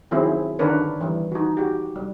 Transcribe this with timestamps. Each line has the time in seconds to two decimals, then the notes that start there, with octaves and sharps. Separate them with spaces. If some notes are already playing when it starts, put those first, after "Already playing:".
0.11 D#3 F#3 C4 E4 G#4
0.59 D3 D#3 D4 A#4 B4 C#5
1.01 E3 G3
1.32 D#4 F#4
1.57 F#4 G4
1.96 G3